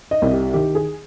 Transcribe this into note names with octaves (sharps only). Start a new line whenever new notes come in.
D#5
C2
G4
D#3 G4
G#4